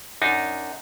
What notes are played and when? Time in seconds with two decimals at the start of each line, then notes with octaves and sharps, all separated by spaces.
0.22 F#2 D4 D#4